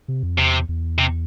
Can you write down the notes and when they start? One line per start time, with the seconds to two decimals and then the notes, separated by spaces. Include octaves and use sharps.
0.08 C3
0.23 F2
0.38 E2 C3
0.69 E2
0.98 C3